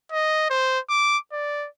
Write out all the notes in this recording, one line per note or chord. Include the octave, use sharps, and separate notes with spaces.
D#5
C5
D6
D5